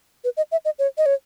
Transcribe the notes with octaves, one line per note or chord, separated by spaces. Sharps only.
B4
D#5
E5
D#5
C#5
D#5
C#5